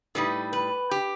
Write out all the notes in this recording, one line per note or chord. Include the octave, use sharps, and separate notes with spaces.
A2 G3 D#4 B4
B4
G4